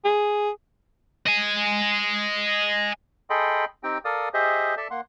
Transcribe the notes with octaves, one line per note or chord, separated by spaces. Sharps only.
G#4
D#5 G#5
G#4 A4 D#5 G5 B5 C6
C4 D#4 G4 G5
A4 A#4 D5 F5 D#6
G4 G#4 C5 D#5 E5
A4 D5 E5 A5
A#3 F#5 C6